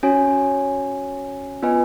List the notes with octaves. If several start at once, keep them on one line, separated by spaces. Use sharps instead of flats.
C#4 F#4 C#5 G#5
B3 F4 B4 D#5 G#5